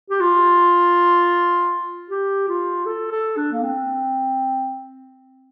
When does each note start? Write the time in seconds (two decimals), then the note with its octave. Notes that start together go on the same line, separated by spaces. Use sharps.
0.10 G4
0.20 F4
2.10 G4
2.48 F4
2.86 A4
3.11 A4
3.37 D4
3.52 A#3
3.62 C4